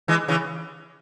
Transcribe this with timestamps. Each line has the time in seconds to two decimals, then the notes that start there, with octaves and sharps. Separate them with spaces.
0.08 E3 G#3
0.28 C#3 E3